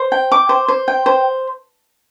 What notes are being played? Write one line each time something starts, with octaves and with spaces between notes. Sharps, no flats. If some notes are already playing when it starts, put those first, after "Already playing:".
Already playing: C5
G5
D6
C5
C5
G5
C5